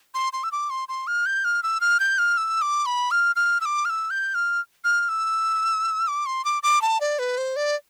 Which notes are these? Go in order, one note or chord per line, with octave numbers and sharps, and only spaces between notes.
C6
C6
E6
D6
C6
C6
F6
G6
F6
E6
F6
G6
F6
E6
D6
B5
F6
F6
E6
D6
F6
E6
G6
F6
F6
E6
D6
C6
D6
D6
A5
D5
B4
C5
D5